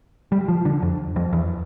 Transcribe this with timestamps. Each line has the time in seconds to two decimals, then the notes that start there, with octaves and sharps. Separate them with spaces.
0.32 G3
0.48 F3
0.65 D3
0.82 F2
1.16 F2
1.33 E2